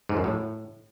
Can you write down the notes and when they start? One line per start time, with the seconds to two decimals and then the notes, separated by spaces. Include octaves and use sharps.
0.09 G#2
0.17 F#2
0.24 A2